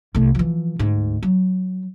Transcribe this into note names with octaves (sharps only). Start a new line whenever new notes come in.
C2 A3
E3 F3
D2 G#2
F#3